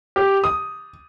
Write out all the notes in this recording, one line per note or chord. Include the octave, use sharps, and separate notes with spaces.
G4
D#6